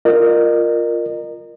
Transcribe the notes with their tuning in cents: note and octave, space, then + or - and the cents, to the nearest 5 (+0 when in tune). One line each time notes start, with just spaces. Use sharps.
F4 +0 A#4 +0 D#5 -40